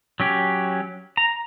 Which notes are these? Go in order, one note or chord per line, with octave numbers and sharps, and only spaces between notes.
F#3 C#4 G4
A#5